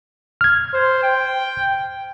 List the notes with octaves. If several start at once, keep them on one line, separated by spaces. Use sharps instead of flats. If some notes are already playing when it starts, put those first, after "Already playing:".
F6 G#6
C5
G5